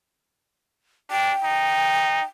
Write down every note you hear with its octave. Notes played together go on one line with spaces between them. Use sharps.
D4 G5
D#4